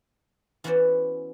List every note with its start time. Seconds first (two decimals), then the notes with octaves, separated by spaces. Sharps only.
0.64 E3 B3 C#4 F#4 C5 D5